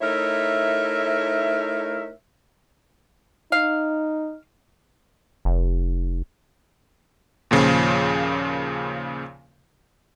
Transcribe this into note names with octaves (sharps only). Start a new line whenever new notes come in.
A3 D#4 E4 A#4 C#5 E5
D#4 F5
F1
D#2 A#2 C#3 F3